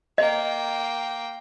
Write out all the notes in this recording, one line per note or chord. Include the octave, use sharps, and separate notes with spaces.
A#3 D#5 G5